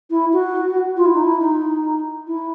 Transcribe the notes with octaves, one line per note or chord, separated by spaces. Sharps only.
E4
F#4
F4
E4
D#4
E4
D#4
E4